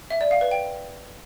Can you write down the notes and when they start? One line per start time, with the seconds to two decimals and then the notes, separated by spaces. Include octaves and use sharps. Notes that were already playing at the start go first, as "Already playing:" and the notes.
0.10 E5
0.21 D5
0.31 F5
0.41 B4
0.51 G5